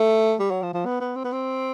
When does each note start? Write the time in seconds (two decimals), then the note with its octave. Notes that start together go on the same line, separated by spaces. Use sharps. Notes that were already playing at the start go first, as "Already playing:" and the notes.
Already playing: A3
0.39 G3
0.51 F#3
0.63 F3
0.74 F3
0.86 B3
1.00 B3
1.16 C4
1.24 B3
1.33 C4